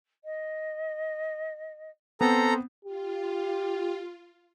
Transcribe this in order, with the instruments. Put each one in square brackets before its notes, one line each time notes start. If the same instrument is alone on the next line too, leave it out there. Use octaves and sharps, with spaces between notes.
[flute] D#5
[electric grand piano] B3 C4 [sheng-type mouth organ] A4 A#5 [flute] C5
[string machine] F4 [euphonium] G4